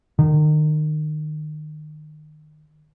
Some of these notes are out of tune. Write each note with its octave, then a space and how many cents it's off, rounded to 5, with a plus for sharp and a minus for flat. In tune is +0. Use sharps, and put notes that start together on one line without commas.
D#3 -30